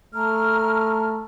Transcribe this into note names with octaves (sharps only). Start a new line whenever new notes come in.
A3 A#5 F6